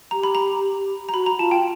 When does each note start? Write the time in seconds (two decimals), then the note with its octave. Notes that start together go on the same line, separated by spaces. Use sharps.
0.11 G4 A#5
0.23 B5
0.35 A#5
1.09 A#5
1.13 F#4 B5
1.26 A#5
1.39 F4 A5
1.51 G5